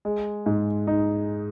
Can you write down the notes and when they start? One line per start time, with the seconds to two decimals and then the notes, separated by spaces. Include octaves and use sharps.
0.05 G#3
0.46 G#2
0.87 D#4